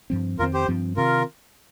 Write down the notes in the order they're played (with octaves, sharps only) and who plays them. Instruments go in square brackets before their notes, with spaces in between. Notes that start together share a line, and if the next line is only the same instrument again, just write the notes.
[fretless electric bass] G2 F3 C4
[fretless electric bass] F2 D#3 C4 [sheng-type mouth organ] F4 A#4
[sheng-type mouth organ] G4 C5
[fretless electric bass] G2 F3 C4
[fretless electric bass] C3 D#3 C4 [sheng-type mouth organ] F4 A#4